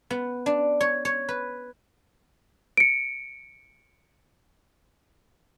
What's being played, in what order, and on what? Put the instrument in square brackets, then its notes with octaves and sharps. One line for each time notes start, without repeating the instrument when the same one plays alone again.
[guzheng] B3
D4
C#5
C#5
B4
[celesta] C#7 D7